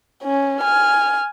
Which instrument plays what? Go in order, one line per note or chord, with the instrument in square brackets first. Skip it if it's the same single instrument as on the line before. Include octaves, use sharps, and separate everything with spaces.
[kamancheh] C#4
G#5 F6